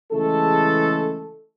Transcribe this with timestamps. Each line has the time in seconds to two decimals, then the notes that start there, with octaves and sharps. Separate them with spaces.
0.12 C#3 E3 G#3 A3 A4